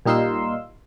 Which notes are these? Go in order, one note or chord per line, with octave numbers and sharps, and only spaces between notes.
A#2 G3 D#4 F5 C6 E6